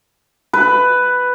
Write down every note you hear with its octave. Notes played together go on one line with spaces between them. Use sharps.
B4